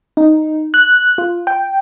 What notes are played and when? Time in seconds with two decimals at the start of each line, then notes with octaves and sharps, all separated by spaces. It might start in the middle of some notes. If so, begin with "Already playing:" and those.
0.17 D#4
0.74 F#6
1.18 F4
1.47 G5